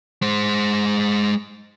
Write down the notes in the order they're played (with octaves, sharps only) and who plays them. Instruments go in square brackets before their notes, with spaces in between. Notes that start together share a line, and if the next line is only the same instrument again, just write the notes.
[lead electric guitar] G#3 C5